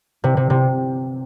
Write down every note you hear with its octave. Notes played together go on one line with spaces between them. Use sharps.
C3
C3
C3